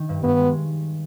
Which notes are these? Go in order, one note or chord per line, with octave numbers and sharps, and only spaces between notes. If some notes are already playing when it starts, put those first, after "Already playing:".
Already playing: D#3
G2
G2 B3
G#3